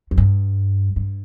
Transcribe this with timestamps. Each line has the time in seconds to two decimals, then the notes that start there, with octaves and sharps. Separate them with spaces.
0.11 F2
0.18 G2
0.96 G2